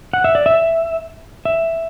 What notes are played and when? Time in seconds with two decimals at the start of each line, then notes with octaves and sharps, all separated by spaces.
0.13 F#5
0.24 E5
0.35 D5
0.46 E5
1.45 E5